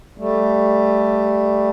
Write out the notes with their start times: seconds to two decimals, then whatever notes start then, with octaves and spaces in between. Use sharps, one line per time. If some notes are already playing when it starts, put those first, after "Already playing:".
0.18 G3 A3